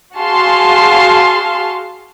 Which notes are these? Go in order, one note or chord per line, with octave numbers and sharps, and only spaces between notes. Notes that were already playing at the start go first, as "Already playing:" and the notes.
F#4 G#4 F5 A5 C6